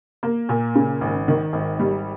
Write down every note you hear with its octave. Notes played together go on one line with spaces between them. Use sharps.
A#3
A#2
C#3
G#1
D#3
G#1
G3